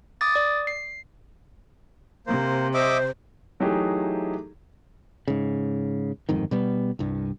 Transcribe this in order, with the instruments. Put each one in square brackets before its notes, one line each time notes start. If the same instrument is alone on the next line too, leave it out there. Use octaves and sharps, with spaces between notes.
[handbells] D6 D#6 A6
D5
C7
[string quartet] C3 [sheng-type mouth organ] A#3 C5
[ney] C5 [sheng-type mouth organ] D#5 E5 D6
[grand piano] E3 F#3 A3 D#4 G4 G#4
[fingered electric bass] G#2 C#3
G1 F2 G#2 D#3
B2 G3 B3
C2 G2